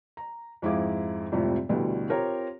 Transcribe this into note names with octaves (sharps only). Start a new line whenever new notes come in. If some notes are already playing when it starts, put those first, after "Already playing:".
A#5
F2 G#2 E4 G#4 F5 D6
G#1 F2 A2 C3 F3 G3
D2 B2 D3 E3 G3
C4 F4 G4 A#4 C#5